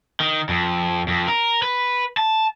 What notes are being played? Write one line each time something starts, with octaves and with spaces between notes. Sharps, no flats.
D#3
F2
F2
A#4
B4
A5